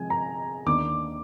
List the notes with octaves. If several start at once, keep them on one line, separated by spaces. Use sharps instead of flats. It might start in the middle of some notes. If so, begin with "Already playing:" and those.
Already playing: C3 F3 G#3 C4 G#5
A#5
D#2 D#3 A#3 D4 D6